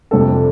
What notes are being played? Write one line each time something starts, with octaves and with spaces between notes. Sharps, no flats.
F2 C3 G3 D4 A4